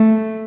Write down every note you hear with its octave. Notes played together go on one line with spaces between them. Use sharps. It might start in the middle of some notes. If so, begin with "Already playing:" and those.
Already playing: A3